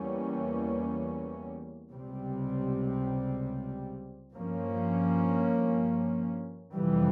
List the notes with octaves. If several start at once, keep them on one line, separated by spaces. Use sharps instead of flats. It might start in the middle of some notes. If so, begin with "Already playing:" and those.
Already playing: E2 E3 G3 A#3 C#4
C#2 C3 G3 C4
G2 F3 A#3 C#4
F2 C3 E3 G3